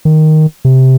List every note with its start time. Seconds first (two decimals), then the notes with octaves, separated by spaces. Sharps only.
0.05 D#3
0.65 C3